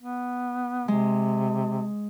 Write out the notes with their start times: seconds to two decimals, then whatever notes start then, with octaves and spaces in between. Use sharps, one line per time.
0.01 B3
0.88 C3 G#3